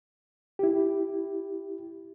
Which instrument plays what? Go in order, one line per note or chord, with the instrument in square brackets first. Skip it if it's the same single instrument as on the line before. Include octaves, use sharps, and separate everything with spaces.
[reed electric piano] E4 G4